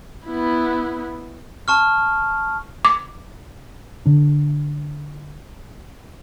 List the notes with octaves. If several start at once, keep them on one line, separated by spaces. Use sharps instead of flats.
B3 E4
A5 C#6 F6
D6
D3 D4